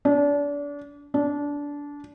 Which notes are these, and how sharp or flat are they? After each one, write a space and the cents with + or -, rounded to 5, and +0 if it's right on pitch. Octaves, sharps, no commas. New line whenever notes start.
D4 -30
D4 -20